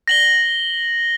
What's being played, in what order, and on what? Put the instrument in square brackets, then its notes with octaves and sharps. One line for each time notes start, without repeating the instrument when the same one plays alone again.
[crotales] A#6 F#7 G7